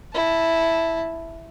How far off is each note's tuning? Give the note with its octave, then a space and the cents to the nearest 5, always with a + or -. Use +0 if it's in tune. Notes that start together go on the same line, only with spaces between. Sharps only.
E4 +0 A5 +0